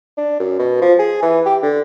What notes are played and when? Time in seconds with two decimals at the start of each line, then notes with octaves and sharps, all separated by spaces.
0.18 D4
0.40 F#2
0.59 B2
0.82 F3
0.99 G#4
1.22 E3
1.46 G4
1.63 D3